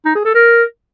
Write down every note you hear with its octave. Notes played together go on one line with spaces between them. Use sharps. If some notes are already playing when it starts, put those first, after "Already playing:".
D#4
G#4
A4
A#4